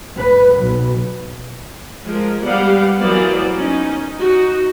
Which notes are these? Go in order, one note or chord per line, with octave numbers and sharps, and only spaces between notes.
B4
B1
F3 G#3 A#4
G3 B3 G4 D5 F5 F#5
E3 F#3 A#3 B3 C5 D5
C#4 D#4
D#4 F#4